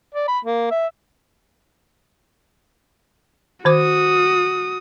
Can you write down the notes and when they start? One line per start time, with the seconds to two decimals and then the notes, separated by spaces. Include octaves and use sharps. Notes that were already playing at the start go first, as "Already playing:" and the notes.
0.15 D5
0.28 B5
0.45 A#3
0.71 E5
3.65 D#3 F#4 C5 D6 D#6